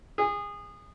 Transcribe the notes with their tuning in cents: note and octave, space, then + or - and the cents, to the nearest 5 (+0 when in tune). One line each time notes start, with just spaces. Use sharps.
G#4 -25